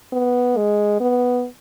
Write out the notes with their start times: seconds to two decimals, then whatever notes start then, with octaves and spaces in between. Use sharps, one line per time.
0.12 B3
0.57 G#3
1.00 B3